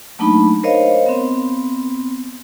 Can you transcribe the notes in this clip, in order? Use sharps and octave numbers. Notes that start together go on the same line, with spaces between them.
F#3 A3 A#3 D4 D#4 B5
A#4 C5 C#5 D#5 F5
B3 C4